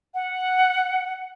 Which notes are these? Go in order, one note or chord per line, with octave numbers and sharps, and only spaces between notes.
F#5